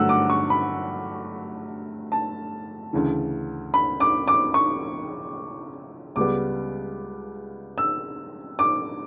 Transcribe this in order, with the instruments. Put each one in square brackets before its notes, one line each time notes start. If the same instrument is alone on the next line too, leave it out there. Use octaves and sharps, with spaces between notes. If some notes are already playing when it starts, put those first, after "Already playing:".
Already playing: [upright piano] G2 D3 F#3 A3 F#5 E6
D6
C#6
B5
A5
D2 C#3 E3
B5
D6
D6
C#6
C#2 C#3 G3 B3 D6
E6
D6